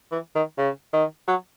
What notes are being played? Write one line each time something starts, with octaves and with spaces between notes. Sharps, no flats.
E3
D#3
C#3
D#3
F#3